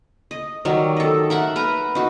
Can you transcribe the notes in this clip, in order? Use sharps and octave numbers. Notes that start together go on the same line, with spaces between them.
D#5
D#3 F#3 G3
A4 D#5
A#4 E5 F#5
A#4 B4 A#5
D#4 F#4